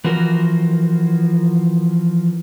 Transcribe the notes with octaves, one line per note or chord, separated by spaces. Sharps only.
E3 F3 C4 F#4 A#4